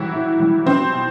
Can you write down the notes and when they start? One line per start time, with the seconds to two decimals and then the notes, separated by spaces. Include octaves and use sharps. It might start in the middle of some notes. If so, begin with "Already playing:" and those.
Already playing: E3 F#3 G3 E4 F#4 G4
0.14 A2
0.40 G3
0.66 F#3 C4
0.93 B2